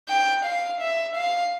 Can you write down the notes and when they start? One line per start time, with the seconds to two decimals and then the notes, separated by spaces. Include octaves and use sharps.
0.09 G5
0.45 F5
0.81 E5
1.16 F5